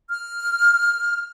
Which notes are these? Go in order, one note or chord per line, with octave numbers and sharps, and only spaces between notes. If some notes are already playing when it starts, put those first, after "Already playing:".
F6